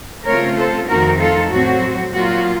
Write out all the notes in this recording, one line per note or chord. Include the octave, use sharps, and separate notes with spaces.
C#3 A3 C4 F4 A#4 C#5
A4 C5
F2 D#3 A3 C4 D#4 F#4 A#4
F4 A4
A2 F#3 C4 F#4
A#2 F#3 A#3 F4 F#4